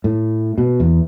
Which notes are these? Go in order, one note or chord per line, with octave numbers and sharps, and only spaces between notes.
A2
B2
E2